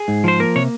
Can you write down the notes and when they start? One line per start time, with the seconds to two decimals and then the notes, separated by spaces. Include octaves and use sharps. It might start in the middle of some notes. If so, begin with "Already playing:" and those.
Already playing: G#4
0.08 G#2
0.24 F3 C5
0.40 A#3 A#4
0.56 C3 C#5